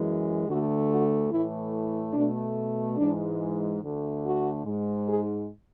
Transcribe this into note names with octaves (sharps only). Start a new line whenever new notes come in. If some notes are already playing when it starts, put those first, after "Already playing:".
Already playing: F#2 E3 G#3
D2 D3 A3 F#4
F#4
A2 E3 A3 E4
B2 A3 D4
G#2 E3 G#3 D4
D2 D3 A3
F#4
G#2 G#3
G#4